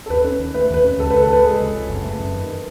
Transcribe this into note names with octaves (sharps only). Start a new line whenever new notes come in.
A4
D#2 B4
C#4
D#3
A3 B4
D#2 B4
C#4
C#2 A4
C#2 B4
A4
C#3 B4
G#3 G#4
C#2
C#2
F#1
A3
F#2
D#3